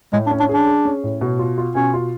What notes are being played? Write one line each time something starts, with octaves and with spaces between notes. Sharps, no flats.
A2 G#3
D4
C#4
D4
G#4
D4
G#4
C#4
A2
B2
F4
F4
B2 C#4
F4